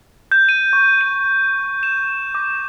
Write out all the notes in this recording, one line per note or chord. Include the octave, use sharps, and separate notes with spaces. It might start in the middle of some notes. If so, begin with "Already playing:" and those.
G6
D#7
C#6
D#7
E7
D6